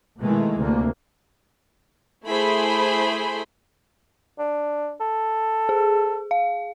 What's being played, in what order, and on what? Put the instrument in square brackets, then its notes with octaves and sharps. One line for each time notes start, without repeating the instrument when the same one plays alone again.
[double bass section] B2 D#3 E3 G#3 A3
D2 C3 A#3
[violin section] A3 E4 G#4 C5 B5
[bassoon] D4
A4
[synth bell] G#4
F5